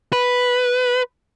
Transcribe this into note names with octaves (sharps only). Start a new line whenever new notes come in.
B4